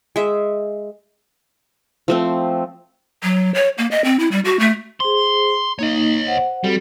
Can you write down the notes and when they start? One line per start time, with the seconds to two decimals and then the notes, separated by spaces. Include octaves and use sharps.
0.16 G#3 E5
2.08 F3 A3 C4
3.23 F#3
3.55 C#5
3.78 A#3
3.91 D#5
4.05 C4
4.19 E4
4.32 G3
4.45 F#4
4.60 A3
5.00 G#4 C5 C6
5.79 A#3 D#4 C#5 D#5
6.27 C5 F#5
6.64 G3 C4 F#4 A4